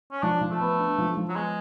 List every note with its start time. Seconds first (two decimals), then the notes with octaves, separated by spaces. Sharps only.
0.12 C#4
0.23 F3 D4
0.41 F3
0.51 A3
0.61 B3
0.79 D4
0.98 F3
1.17 F3
1.29 F#3
1.36 G#3 B3